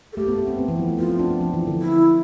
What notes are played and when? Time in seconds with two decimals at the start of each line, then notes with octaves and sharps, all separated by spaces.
0.13 A4
0.17 A3 G4
0.27 B3
0.38 B3
0.47 C4
0.58 B3
0.68 E3
0.79 F3
0.88 A3
0.99 B3 F4
1.09 C4
1.19 D4
1.30 C4
1.41 F3
1.54 E3
1.67 D3
1.82 E4